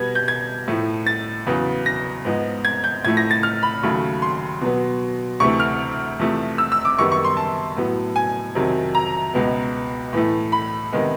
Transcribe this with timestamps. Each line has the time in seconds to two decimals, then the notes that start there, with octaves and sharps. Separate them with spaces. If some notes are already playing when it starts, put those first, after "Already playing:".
Already playing: B2 G3 B3 G#6
0.15 G6
0.28 G#6
0.68 A2 F3 A3
1.07 A6
1.46 E2 C#3 F#3 B3
1.86 A#6
2.25 G#2 F3 G#3 B3
2.65 G#6
2.84 G6
3.04 A2 F3 A3 G#6
3.17 A#6
3.31 A6
3.43 F6
3.63 B5
3.83 D#2 C#3 F#3 A3
4.22 C6
4.61 B2 F#3 B3
5.40 D2 C3 E3 A3 C#6
5.60 F6
6.19 E2 C3 F3 A3
6.58 E6
6.72 E6
6.85 D6
6.99 F#2 D#3 G3 B3 C#6
7.12 C#6
7.25 C6
7.37 A5
7.77 A2 F#3 B3
8.16 G#5
8.55 F2 C3 D#3 F#3
8.95 A#5
9.34 C#2 B2 G#3 B3
10.13 A2 E3 A3
10.52 B5
10.92 C3 D#3 G#3 B3